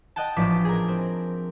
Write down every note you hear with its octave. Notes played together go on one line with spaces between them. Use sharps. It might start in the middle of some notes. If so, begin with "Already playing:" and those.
D#5 F#5 G5 A5
A1 F3 D4 D6 B6
G#4 A#4
C4